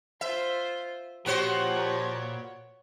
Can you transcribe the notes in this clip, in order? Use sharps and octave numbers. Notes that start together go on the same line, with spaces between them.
F4 C5 E5
A#2 F3 B3 F#4 G4 C5 C#5